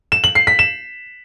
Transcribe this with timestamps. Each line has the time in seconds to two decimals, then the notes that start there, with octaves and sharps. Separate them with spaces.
0.12 E7
0.24 F#7
0.35 C7
0.47 B6
0.59 E7